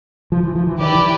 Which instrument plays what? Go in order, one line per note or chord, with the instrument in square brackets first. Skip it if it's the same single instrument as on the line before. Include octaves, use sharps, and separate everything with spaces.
[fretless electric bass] F3
E3
F3
E3
[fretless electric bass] D#3 [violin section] E4 G4 B4 D5
[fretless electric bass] E3